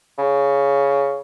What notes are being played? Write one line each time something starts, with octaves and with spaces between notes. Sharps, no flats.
C#3